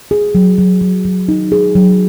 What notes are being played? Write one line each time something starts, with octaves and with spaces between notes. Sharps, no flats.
G#4
F#3
F#3
F#3
F#3
D#4
G#4
F#3